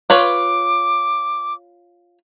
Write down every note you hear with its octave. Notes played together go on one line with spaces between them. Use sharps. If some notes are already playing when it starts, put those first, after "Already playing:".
F4 B4 C#5 D6